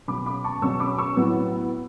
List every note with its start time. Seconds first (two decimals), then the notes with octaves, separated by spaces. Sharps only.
0.08 B2 F#3 C#4 B5 D6
0.26 B5 D6
0.44 A5 C#6
0.62 B2 F#3 C#4 C#6 E6
0.80 B5 D6
0.98 C#6 E6
1.17 A2 F#3 B3